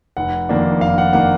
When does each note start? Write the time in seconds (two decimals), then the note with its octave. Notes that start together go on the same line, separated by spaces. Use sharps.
0.17 F1 F#5
0.49 F2 D#3 A#3 D4
0.81 F1 F5
0.98 F#5
1.13 D#3 A#3 D4 F#5